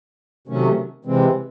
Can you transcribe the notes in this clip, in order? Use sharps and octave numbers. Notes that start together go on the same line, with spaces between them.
C3 D#3 F#3 A3 C#4
C3 E3 G#3 C4